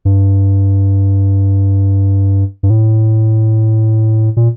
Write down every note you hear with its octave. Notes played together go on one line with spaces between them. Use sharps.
G2
G2
A2
A#2